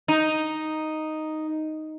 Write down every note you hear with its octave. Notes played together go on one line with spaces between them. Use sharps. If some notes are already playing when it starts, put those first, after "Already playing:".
D#4